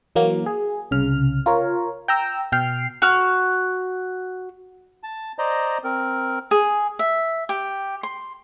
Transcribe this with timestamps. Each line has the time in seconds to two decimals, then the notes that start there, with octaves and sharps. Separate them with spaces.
0.15 E3 F#3 A#3
0.46 G#4
0.91 C2 C#3 F6
1.46 F4 A#4 C#5
2.08 G5 A#5 E6
2.52 B2 G5 F6 C7
3.02 F#4 F6
5.03 A5
5.39 C5 D5 D#5 A#5
5.84 C4 A#4
6.51 G#4
6.99 E5
7.49 G4
8.03 C6